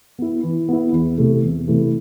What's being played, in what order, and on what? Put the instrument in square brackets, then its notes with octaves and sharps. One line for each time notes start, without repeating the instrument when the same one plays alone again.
[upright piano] B3 E4
E3
B3 E4
E2
C3 E3 A3
E2
C3 E3 A3